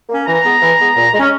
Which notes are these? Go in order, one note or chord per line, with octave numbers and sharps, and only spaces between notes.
A#3 C#4
E3 A#5
G#3 B3
E3
G#3 B3
A#2
G#3
C#4